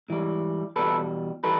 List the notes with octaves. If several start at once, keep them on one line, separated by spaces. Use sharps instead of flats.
G#2 E3 G3
E2 B2 G3 A4 B4
E3 G3 A4 B4